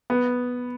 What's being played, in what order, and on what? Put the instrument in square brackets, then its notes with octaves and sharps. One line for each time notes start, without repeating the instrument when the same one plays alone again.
[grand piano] B3